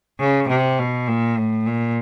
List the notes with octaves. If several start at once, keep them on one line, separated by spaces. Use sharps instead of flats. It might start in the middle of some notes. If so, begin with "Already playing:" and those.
C#3
C3
B2
A#2
A2
A#2